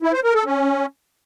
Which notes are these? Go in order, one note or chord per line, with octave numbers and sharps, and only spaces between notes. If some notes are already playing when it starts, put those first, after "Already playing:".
E4
C5
A#4
A4
C#4